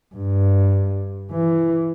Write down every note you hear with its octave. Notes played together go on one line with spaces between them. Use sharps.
G2
E3